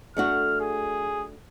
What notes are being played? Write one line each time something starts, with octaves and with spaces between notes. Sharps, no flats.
A3 D4 F#4 F6
G#4